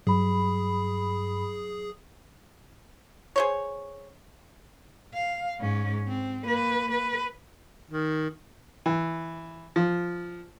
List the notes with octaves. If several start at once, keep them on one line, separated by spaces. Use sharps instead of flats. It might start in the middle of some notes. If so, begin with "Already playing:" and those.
G2 F#3 G#4 B5
G#4 C5 C#5
F5
G#2 C#4
C4
A#3 B4
B4
D#3
E3
F3